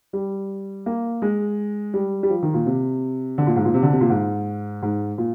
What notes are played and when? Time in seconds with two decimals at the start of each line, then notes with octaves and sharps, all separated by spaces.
0.13 G3
0.86 A#3
1.22 G#3
1.94 G3
2.23 G3
2.29 F3
2.43 D#3
2.54 A#2
2.66 C3
3.38 D3
3.47 A#2
3.56 G#2
3.65 A#2
3.74 C3
3.83 D3
3.92 C3
4.01 A#2
4.10 G#2
4.82 G#2
5.18 A#2